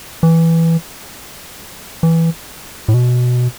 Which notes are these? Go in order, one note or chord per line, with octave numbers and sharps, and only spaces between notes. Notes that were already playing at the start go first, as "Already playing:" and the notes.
E3
E3
A2
B2